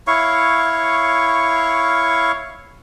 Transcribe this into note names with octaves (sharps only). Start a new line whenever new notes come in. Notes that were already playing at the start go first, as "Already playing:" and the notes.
E4 C#5 F5 C#6